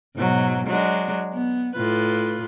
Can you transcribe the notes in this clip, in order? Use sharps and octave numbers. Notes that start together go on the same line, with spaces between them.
G#2 B2 F#3
F#3 G#3 D4
B3
A2 F4 B4